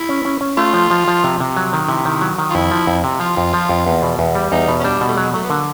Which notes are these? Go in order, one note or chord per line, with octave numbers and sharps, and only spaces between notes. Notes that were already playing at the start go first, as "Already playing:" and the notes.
Already playing: E4
C#4
C#4
C#4
A3 F4
F3
F3
F3
C3
C3
F#3
D#3
C3 E4
D#3
F#3
D#3
F4
F2 E4
F3
F2
C3
F3 F4
F2
F3
F2
E2
B2
E2
G3
E2 D#4
B2
C#4
G3 D4
B2
A3
F#3 G#3
F#3 A3
B3
D3 A#3